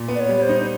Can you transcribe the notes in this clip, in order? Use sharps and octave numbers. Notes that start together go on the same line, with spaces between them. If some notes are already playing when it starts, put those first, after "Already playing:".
Already playing: A#2
B3
D5
C#5
G3
C5
D#4